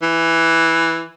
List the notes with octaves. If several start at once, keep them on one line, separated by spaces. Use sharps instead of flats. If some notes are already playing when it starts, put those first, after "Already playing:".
E3